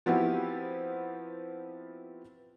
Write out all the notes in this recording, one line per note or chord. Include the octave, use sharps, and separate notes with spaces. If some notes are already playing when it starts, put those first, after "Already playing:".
F3 B3 C4 E4 F#4 G4